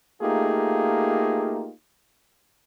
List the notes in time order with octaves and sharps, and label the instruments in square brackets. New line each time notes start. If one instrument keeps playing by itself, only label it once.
[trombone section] A3 A#3 D#4 F4 G4 G#4